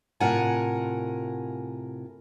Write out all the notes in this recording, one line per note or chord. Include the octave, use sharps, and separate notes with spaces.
A2 C3 F4 A#4 F#5 G#5